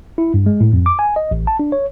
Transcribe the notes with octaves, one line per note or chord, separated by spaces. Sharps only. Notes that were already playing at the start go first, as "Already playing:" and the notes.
E4
G2
G#3
A2
F2
D6
G#5
D#5
A1
A5
D4
C#5